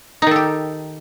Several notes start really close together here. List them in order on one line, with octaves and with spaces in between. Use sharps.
D#4 D#3 A4 G4